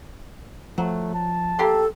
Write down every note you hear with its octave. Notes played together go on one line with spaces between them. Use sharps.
F3 F#3 A3
A5
A#3 G4 A4 C6